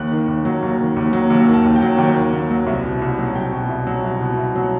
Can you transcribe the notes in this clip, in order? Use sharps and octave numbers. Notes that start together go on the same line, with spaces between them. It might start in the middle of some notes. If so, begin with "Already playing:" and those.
Already playing: D#2 F#6
D#3
D#2
F#3
D#2
D#3
D#2
F#3
D#2 E6
D#3
A5
D#2
G5
F#3
D#2 G5
D#3
D#2
F#3
C2
B2
C2
F#3
C2 G5
B2
C2
F#3
C2
B2
C2
F#3